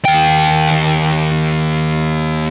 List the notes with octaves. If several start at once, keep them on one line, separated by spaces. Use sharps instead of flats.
D#2 G5